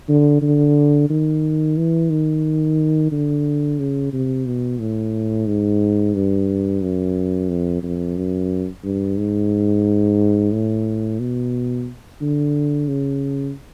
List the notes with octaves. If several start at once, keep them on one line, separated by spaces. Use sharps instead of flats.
D3
D3
D#3
E3
D#3
D3
C#3
C3
B2
A2
G#2
G2
F#2
F2
F2
F#2
G2
G#2
A2
B2
D3
C#3